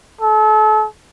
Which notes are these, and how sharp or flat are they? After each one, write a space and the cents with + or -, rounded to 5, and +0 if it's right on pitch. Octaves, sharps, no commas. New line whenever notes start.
A4 -35